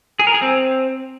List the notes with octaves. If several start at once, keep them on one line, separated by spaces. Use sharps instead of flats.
G#4
A#4
G#4
C4